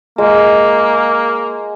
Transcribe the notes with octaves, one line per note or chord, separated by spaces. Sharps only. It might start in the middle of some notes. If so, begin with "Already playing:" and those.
G#3 A#3